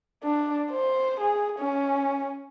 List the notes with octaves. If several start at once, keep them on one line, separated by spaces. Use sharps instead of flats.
D4
C5
G#4
C#4